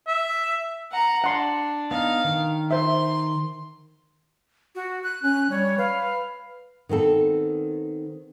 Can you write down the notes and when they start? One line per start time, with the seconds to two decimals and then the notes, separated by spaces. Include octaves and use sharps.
0.07 E5
0.91 F#5 A#5
1.24 D4 F#5 C6
1.91 B3 D#4 F5
2.24 D#3
2.71 C5 E5 C6
4.75 F#4
5.03 F#6
5.23 C#4 F#6
5.50 G3 C#5
5.78 B4 F5
6.89 D#3 B3 C4 A4